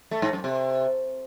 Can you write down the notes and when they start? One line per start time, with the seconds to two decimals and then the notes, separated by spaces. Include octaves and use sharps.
0.11 A3
0.22 G#2
0.33 F#2
0.44 C3